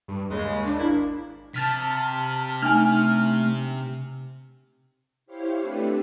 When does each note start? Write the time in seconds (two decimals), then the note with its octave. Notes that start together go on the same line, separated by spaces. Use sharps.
0.08 G2
0.30 D#2 C#3 G#3
0.65 D4
0.78 G#1 A#3 E4
1.54 C3 A5 F6 B6
2.62 A3 D4 D#4 G#5 F6
5.26 E4 G4 C5 C#5 F5
5.60 A3 C4 D4 G4 A4 B4